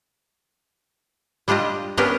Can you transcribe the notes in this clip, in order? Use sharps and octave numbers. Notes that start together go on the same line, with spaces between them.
G3 D4 F4 G4 D#5
B3 C#4 D4 G4 A#4 B4